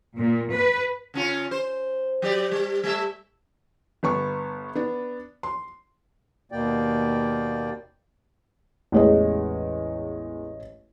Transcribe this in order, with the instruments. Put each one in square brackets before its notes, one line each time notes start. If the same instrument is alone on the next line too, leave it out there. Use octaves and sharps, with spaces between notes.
[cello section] A#2
B4
[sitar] C#3 C#4 F4
C5
F#3 G4 D5
G3
G3 A3 E5
[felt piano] G1 B3 C#6
B3 D4
C6
[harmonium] D#2 B2 A#3 D5 G5
[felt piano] A1 C#5 D#5 [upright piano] E2 G#3